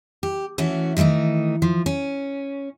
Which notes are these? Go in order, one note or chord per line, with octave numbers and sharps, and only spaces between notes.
G4
E3 A3 C#4 F#4
D#3 E3 G3 A3 D#4
F3
C#4